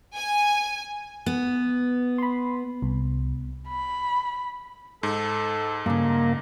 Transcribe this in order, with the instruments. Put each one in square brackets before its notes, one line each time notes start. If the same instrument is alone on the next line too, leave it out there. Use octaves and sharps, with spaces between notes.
[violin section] G#5
[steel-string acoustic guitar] B3
[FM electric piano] B5 C6
C2
[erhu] B5
[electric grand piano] G#2 [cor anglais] A4
[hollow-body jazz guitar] G2 C#3 [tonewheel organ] A#3